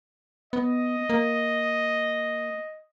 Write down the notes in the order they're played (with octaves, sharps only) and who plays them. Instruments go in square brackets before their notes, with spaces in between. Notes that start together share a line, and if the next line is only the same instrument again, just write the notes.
[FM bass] B3 [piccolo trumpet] D#5
[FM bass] A#3